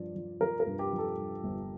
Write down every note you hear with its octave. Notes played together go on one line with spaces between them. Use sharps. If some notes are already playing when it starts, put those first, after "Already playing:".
Already playing: G2 F3 D5
F3
F3 A#4
A#4
G2
G4
F3
A4
G2
G1